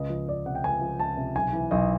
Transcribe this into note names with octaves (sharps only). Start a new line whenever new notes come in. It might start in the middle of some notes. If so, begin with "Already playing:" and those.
Already playing: C#2 D#5
F3
C#2 D5
C3 F#5
G5
C#2 G#5
F3
C#2 A5
C3
B1 G#5
E3
B1 D#5